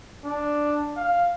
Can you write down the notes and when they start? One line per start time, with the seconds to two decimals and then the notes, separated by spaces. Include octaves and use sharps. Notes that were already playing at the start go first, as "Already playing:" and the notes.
0.25 D4
0.97 F5